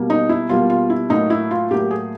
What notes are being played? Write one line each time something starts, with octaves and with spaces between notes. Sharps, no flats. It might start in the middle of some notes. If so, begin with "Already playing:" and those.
Already playing: B2 G3 A#3
D#4
E4
B2 G3 A#3 F4
F4
E4
A2 F#3 A#3 D#4
E4
F4
A2 F#3 A#3 G4
G#4